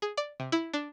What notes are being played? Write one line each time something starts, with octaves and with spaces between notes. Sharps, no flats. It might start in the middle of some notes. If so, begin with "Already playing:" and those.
G#4
D5
C3
E4
D4